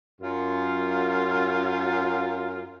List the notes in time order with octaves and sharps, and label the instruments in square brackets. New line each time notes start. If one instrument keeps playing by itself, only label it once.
[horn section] F#2 F4